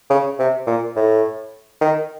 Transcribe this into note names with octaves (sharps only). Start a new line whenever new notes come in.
C#3
C3
A#2
A2
D#3